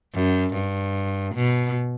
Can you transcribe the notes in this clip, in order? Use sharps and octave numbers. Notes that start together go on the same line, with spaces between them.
F#2
G2
B2